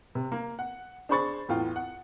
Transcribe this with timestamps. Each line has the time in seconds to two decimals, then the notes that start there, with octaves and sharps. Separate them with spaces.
0.15 C3
0.32 A#3
0.59 F#5
1.09 D4 G#4 C5 B5 C#6 A6
1.49 E2 A2 F4 G5
1.76 F#5